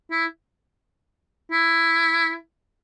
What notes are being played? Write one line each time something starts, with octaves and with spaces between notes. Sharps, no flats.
E4
E4